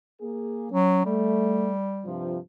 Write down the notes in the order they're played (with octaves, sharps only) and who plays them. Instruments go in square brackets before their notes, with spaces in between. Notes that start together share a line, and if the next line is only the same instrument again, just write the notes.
[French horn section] A#3 G#4
[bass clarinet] F#3 [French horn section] C#4
[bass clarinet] G3 [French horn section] A3
[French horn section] G2 C3 F3